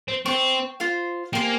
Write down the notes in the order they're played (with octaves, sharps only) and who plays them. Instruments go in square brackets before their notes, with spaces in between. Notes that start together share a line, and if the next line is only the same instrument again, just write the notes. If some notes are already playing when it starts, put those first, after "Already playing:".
[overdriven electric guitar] C4
[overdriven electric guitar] C4 [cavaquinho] C5 G5 C#6
[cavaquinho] F4 C5 F5
[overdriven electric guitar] A#3 [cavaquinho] G4 C5 F5 G#5